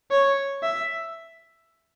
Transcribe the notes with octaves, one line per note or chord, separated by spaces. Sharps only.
C#5
E5